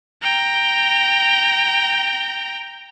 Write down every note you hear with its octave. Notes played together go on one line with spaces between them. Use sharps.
G5 A#5